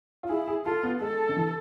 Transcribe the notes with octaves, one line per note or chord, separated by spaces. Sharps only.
F4
E4 G#4
G#4
F4 A4
B3
G#3 A4
D3
E3